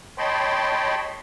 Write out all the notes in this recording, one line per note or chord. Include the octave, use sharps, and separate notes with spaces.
C#5 D#5 G5 A5 B5 C6